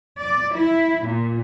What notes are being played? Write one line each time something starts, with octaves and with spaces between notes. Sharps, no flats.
D5
E4
A#2